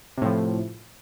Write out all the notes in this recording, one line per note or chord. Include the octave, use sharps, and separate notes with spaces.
A2 C3 F3